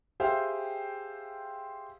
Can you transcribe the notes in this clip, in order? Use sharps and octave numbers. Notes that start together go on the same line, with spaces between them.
G4 G#4 C5 E5 F5 G5